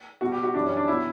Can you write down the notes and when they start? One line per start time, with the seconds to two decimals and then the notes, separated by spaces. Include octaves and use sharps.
0.21 B2 G3 F#4
0.32 G4
0.43 F#4
0.54 F#2 E3 G3 D4
0.66 C#4
0.77 D4
0.88 B2 F#3 E4